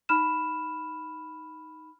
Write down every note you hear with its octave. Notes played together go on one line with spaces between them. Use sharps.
D#4 B5 F6 E7